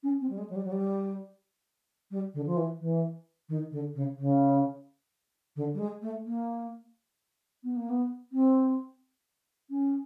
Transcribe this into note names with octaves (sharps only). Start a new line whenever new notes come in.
C#4
C4
G3
G#3
F#3
G3
F#3
G3
G3
D3
F3
E3
E3
D#3
D3
C#3
C#3
D3
G3
G#3
A3
A#3
B3
A#3
B3
C4
C#4